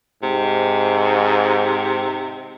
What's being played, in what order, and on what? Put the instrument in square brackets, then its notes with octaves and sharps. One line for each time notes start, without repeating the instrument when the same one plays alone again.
[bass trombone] G#2 [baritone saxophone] C3